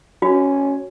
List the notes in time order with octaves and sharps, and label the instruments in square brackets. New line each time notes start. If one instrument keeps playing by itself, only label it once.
[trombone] C#4 [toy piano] F#4